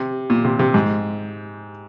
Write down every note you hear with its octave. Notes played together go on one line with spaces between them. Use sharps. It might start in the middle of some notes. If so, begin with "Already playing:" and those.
Already playing: C3
A#2
C3
C3
G#2